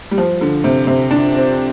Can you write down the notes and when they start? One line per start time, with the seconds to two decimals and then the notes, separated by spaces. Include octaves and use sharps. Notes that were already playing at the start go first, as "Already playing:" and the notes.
0.11 G3
0.18 F3
0.41 D3
0.64 C3
0.87 C3
1.11 D4
1.35 C4